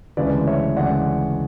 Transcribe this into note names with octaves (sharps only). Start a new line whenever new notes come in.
D2 C#3 E3 G#3 B4 D5
C#5 E5
D2 C#3 E3 G#3 D5 F#5